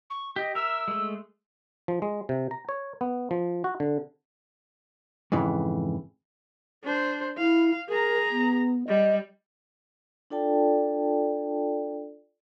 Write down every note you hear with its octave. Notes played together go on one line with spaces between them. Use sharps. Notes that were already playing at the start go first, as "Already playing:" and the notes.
C#6
G4 D#5
A#4 E5 E6
G#3 A3
F3
G#3
C3
A#5
C#5
B3
F3
F#4
D3
F2 G#2 C#3 E3
D4 C5
E4 F5
G#4 A#4 A#5
B3
G3 D#5
D4 F4 A4 D5 G5 A5